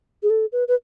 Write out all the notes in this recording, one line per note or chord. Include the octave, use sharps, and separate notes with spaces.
G#4
A4
B4
B4